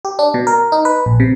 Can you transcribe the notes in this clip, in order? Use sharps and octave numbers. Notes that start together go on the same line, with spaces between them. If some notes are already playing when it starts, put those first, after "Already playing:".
G4
D4
B2
A#4
D#4
B4
A#1
C3